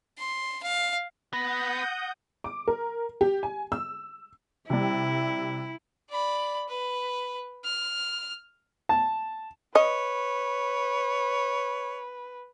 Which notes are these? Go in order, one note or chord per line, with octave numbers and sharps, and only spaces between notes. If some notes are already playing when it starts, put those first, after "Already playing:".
C6
F5
B3 F#5 D#6 G6 A#6
D6
A#4
G4
G#5
E6
C3 G3 E4
D5 B5
B4
F6
A5
B4 C#5 D#5